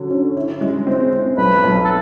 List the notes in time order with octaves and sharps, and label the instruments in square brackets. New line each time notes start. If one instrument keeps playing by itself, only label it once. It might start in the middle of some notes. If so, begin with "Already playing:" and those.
Already playing: [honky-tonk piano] D3 F#3 C#4
C#4
E4
G#3
C4
C4
[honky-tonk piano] B1 [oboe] B4
[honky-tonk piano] B1
[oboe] A4